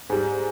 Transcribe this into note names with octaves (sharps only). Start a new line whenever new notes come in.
G#2 G3